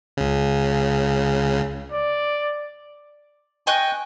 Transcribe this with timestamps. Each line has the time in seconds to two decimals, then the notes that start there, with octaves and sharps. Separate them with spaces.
0.17 C#2 C#3
1.92 D5
3.67 D#5 G5 G#5 C#6 F#6